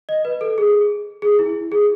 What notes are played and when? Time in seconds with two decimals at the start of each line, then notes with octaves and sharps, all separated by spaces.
0.09 D#5
0.25 B4
0.41 A4
0.58 G#4
1.22 G#4
1.39 E4
1.72 G#4